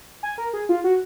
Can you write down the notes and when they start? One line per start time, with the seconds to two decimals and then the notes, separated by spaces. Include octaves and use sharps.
0.23 G#5
0.38 A#4
0.53 G#4
0.69 F4
0.84 F#4